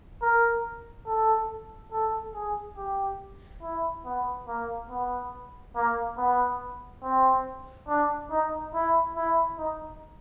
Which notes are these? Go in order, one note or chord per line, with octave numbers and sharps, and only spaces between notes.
A#4
A4
A4
G#4
G4
E4
B3
A#3
B3
A#3
B3
C4
D4
D#4
E4
E4
D#4